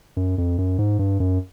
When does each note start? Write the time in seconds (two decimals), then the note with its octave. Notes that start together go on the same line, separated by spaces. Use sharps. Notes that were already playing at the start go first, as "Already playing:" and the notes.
0.17 F#2
0.38 F2
0.58 F#2
0.79 G#2
0.99 G2
1.20 F#2